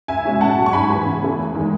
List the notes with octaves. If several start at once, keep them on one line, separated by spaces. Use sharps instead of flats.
C#2 E5 G#5
B2 G#3 C#4 E4
A2 F#5 A5
F#3 C#4
C#6
G#2 G#5 B5
E3 B3
C#3
E3 A3
E2
D#3 G#3